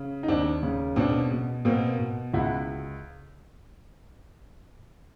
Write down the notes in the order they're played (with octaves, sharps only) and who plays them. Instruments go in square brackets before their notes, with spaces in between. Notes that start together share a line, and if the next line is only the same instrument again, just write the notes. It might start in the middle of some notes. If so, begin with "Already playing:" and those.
Already playing: [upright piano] C#3
D#4
D#2 C4 D4
C#3
B2 C4 D4
B2
B2 A#3 C4
B2
C#2 E4 F#4